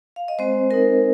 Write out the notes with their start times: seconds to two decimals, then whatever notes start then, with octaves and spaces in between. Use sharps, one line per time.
0.16 F5
0.28 D#5
0.39 G#3 C4 C5
0.70 C4 D#4 A#4